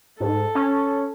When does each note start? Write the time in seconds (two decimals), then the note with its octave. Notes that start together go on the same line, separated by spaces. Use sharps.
0.20 G#2 A4
0.55 C#4